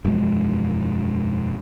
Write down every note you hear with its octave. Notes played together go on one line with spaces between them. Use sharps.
E1 F#2 F3 G#3